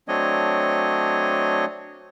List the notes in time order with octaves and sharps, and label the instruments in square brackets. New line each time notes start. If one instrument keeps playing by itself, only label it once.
[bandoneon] F#3 A3 C4 D4 C#5 D#5